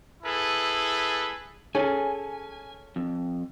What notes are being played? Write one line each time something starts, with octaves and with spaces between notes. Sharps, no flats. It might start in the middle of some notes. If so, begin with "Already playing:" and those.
E4 G#4 A4 B4
C#4 G#4 A4 G#5
F2